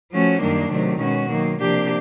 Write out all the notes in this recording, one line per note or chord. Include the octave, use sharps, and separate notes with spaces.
F3 A3 C#4 F#4
F#2 D#3 G3 A#3 D4
C3 D#3 F#3 A3
B2 G#3 C#4 F#4
D#3 F#3 A#3
C3 F3 A#3 D4 G4